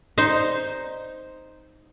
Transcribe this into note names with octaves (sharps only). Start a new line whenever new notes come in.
D#4 C5